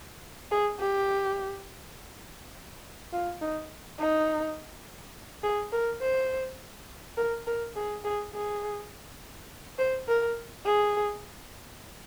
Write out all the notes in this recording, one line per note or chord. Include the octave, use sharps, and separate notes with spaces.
G#4
G4
F4
D#4
D#4
G#4
A#4
C5
A#4
A#4
G#4
G#4
G#4
C5
A#4
G#4